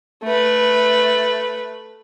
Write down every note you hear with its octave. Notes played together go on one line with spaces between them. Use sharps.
A3 B4